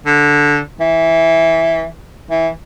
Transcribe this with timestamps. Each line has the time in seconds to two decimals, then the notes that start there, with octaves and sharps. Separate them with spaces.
0.06 D3
0.80 E3
2.30 E3